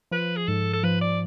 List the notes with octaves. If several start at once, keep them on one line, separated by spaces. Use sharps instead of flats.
F3 B4
G#4
G#2 A4
A4
F3 B4
D5